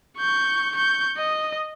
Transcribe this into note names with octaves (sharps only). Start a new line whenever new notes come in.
C#6 G6
C#6 G6
D#5